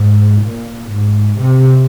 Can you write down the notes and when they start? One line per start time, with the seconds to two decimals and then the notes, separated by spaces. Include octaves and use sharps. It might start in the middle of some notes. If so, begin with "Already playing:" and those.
Already playing: G#2
0.43 A#2
0.91 G#2
1.38 C3